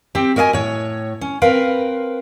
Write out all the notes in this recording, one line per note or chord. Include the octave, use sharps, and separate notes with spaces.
C4 G4
F#4 A#4 D#5 F5 G#5
A2 C#5
C#4
C4 A#4 B4 F5